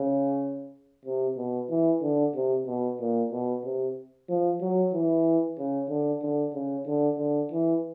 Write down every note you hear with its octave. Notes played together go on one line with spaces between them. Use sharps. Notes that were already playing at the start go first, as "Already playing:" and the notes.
Already playing: C#3
C3
B2
E3
D3
C3
B2
A#2
B2
C3
F3
F#3
E3
C#3
D3
D3
C#3
D3
D3
E3